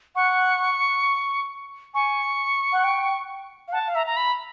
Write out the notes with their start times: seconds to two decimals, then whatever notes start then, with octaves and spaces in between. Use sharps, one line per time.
0.15 F#5 C#6
1.94 G#5 C#6
2.72 F#5
2.84 G5
3.68 F5
3.72 F#5 A5
3.87 F5
3.95 E5 A#5
4.07 A#5
4.17 B5